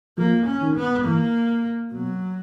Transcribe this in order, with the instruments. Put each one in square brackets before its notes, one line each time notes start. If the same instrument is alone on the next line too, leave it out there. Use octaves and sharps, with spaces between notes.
[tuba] F3 [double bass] A#3
[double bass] C#4
[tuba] D#3
[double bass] B3
[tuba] E3 [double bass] A#3
[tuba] B2 [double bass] F#3